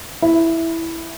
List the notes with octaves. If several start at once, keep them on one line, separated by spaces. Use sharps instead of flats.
E4